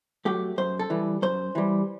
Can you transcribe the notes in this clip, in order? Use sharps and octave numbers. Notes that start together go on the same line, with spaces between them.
F#3 A3 G4
F#2 C5
A4
E3 G3
F#2 C5
E3 G3